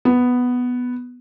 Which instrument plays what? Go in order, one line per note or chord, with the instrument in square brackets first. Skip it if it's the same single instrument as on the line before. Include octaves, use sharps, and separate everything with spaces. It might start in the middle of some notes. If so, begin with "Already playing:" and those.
[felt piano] B3